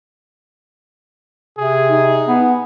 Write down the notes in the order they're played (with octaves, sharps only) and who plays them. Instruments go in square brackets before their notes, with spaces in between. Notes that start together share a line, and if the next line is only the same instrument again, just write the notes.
[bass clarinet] C3 [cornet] G#4
[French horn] D#4
[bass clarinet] B3